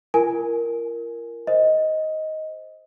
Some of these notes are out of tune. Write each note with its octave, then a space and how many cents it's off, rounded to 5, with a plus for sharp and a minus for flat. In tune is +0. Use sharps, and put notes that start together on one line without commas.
F4 -45 A#4 +0 G#5 +0
C5 +0 D#5 +10